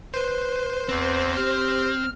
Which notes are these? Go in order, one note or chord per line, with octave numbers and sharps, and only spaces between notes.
B4 C5
E2 C4
G4 F6